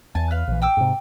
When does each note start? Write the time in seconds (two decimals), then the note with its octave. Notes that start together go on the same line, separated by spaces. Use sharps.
0.15 E2 G#5 A5
0.31 B4 F5
0.48 A#1 E3
0.62 G5 D6 E6
0.77 G#2 C3